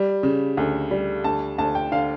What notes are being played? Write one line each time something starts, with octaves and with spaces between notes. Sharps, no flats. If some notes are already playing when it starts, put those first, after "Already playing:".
Already playing: G3
C#3
D2
G3
D2 A5
D2 A5
G5
D3 F5